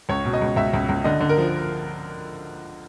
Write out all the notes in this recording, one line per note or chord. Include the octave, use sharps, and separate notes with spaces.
C#2 C#5
B2
D#5
C#2
C#2 E5
C#2
C#2
D3 D#5
D3
A#4
F3